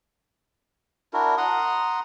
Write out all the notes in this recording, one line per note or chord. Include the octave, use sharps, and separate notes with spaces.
D4 E4 F#4 A#4
F#5 A#5 C6 D#6